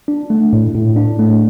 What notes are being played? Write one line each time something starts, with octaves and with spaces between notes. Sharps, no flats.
D4
A3
A2
A2
D4
A3